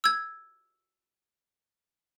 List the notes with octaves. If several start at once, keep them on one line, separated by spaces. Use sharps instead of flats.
E6 G#6